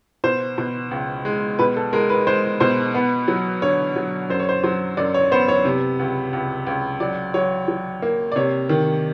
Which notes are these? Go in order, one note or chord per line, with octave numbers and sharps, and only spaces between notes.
B2 C5
B2
C#2
G#3
B2 B4
A4
G#3 A#4
B4
G#3 C5
B2 C5
B3
F#3
D3 C#5
F#3
F#2 C5
C#5
C5
F#3 C5
F#2 D5
C#5
B3 C5
C#5
C3
C#2
C#2
C#2
F#3 D5
F#3 C#5
F#3
A#3
D5
C3 C#5
D#3